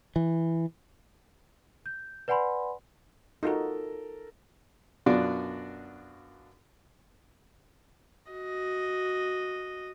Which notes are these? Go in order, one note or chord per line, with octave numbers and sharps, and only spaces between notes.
E3
G6
B4 D5 F#5 G#5 B5 C6
D#4 F4 F#4 A4 A#4
F#2 B2 D4 F4 F#4 D5
F#4 D#5